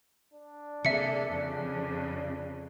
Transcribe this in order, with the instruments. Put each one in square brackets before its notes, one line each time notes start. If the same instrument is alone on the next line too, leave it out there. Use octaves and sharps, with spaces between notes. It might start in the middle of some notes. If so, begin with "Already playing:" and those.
[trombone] D4
[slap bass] C3 [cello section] A#3 G#4 A4 [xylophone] E5 C#7
[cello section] F2 C#3